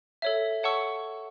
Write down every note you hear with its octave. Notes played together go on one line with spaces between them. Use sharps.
A4 C#5 E5
C#5 F#5 A5 C#6 E6